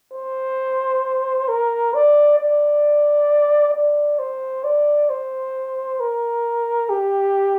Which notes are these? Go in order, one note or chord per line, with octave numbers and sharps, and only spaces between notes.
C5
A#4
D5
D5
D5
C5
D5
C5
A#4
G4